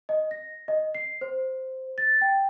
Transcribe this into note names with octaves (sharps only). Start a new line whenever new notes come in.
D#5
A#6
D#5
C7
C5
A6
G5